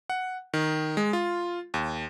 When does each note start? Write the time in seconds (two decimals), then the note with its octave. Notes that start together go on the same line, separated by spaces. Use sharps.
0.10 F#5
0.54 D#3
0.97 G#3
1.13 F4
1.74 D#2